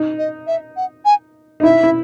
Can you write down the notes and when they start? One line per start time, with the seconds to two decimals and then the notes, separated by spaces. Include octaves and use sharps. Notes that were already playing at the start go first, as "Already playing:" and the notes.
Already playing: D#4
0.18 D#5
0.47 E5
0.77 F#5
1.05 G#5
1.60 D#4
1.63 E4 E5
1.83 E4